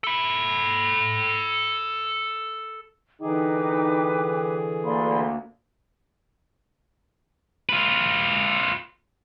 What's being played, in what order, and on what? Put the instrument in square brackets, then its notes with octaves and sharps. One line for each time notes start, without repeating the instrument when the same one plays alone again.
[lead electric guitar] A4 B5
[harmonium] D3 E3 G#4 [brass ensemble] D#4 [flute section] B4 G5 D6
[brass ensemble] D2 A#3 [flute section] D5 B5 C6
[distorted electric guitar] F4 B4